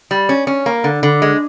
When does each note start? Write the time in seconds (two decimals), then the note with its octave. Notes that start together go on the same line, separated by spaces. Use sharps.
0.11 G3
0.29 C#4
0.47 C#4
0.66 A#3
0.84 D3
1.03 D3
1.22 G#3